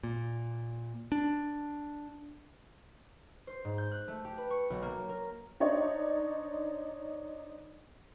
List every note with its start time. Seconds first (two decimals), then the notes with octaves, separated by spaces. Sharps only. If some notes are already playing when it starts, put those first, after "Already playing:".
0.03 A#2
1.12 D4
3.47 C5
3.65 G#2
3.78 G6
3.92 F#6
4.08 A3
4.25 G4
4.38 B4
4.51 C#6
4.70 B1
4.82 A#3
5.09 A#4
5.60 D4 D#4 C5 C#5